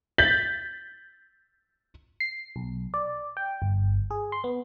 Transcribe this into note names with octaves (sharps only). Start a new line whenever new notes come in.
G6 A6 B6 F#7
C7
B1
D5
G5
G1
G#4
C6
B3